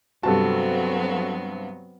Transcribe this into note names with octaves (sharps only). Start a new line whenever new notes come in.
G2 C3 F#3 B3 C4 F#4 A4 A5